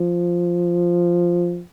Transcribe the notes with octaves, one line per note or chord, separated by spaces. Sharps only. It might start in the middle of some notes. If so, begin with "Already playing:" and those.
Already playing: F3